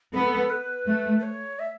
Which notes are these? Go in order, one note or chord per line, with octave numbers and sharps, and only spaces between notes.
B3 A4
B4
A3
B4
C#5
E5